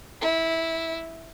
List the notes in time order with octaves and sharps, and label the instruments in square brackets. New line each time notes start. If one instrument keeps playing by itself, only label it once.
[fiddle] E4